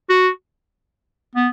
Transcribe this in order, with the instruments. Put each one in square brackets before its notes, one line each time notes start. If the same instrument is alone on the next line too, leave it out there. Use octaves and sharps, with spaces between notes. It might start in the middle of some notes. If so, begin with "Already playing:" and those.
[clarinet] F#4
B3